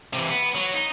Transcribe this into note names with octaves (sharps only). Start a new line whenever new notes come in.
C3 E3
B3
F#3
D#4